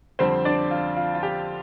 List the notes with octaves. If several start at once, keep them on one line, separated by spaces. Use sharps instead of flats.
F2 D3 G3 C4 C5
D4 D5
F4
F4
F4
G4